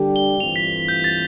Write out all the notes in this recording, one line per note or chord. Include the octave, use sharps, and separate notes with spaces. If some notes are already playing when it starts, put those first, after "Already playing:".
Already playing: D3 G3 D4 G4
G7
G2 E3 A3 C4 F4 F7
B6
G6
A6